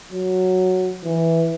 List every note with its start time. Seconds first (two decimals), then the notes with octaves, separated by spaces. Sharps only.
0.12 F#3
1.04 E3